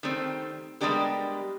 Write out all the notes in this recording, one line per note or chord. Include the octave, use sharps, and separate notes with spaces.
D#3 G3 A3 C4
G3 G#3 B3 D4 G4 A#4